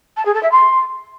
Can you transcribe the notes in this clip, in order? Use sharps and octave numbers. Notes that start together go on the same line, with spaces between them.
A5
G#4
A4
E5
C6